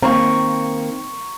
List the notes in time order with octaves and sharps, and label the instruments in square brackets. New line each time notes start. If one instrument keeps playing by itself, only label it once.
[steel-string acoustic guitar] D#3 A#3 [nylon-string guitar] C4 [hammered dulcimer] A#5 C#6